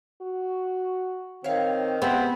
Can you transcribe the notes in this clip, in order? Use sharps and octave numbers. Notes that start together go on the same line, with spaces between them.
F#4
D#3 C4 C#5 F5
C3 B3 C4 G#4 B4